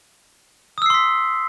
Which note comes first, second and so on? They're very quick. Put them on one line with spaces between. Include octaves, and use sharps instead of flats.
D#6 E6 C7 C6 B6